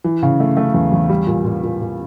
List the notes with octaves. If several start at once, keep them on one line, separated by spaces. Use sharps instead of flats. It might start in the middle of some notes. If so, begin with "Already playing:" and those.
E3
C#3
A3
A3
E2
E2
G3
A#2
A#2
A#2
A#2